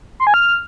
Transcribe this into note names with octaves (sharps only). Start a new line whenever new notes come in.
C6
G#5
F6